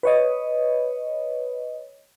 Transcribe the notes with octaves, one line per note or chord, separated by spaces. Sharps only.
B4 C#5 D#5